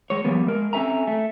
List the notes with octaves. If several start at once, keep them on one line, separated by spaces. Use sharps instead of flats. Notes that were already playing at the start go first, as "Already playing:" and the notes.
G#3 C#5
F3 G3 A#3 B3
G#3 A#4
C4 C#4 A4 E5 G#5 A#5
A3